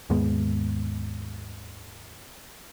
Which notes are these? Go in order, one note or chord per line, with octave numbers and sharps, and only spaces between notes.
D#2 G#2 G#3 B3